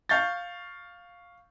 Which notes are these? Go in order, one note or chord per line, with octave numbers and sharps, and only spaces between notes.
F5 C#6 G6 A6